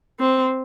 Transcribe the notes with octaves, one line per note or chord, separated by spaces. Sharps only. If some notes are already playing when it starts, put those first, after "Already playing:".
C4